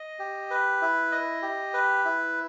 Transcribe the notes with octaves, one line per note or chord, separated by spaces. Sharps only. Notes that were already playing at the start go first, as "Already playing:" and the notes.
Already playing: D#5
G4
B4
E4
D#5
G4
B4
E4